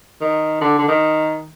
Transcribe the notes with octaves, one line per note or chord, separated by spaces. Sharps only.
D#3
D3
D3
D#3